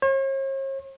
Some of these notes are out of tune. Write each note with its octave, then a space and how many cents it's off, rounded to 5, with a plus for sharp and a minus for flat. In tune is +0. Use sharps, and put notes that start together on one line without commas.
C#5 -45